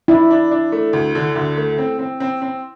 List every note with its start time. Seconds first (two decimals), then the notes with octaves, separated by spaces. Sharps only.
0.08 D4 E4
0.31 D4
0.51 D4
0.72 A3
0.93 D2
1.15 D3
1.35 D2
1.57 A3
1.78 C4
1.99 C4
2.20 C4
2.42 C4